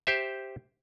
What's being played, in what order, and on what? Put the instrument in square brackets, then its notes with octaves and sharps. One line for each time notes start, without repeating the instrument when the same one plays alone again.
[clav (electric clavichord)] G4 C5 E5